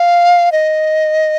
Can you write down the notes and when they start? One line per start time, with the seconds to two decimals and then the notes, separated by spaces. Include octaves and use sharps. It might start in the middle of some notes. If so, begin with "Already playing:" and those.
Already playing: F5
0.52 D#5